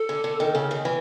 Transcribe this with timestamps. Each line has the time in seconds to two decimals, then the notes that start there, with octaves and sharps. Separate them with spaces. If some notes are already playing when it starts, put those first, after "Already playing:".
Already playing: A4
0.09 D3
0.24 D3
0.40 D#3
0.55 C#3
0.71 D#3
0.85 E3